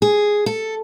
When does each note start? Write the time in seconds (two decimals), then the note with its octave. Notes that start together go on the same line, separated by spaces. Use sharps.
0.02 G#4
0.46 A4